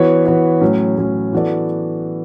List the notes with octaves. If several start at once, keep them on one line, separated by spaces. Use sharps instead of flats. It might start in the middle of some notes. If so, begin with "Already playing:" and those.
Already playing: E3 B3 F#4 C#5
E3 B3 F#4 C#5
A2 F#3 C#4
A2 F#3 C#4
E3 B3 F#4 A4 D5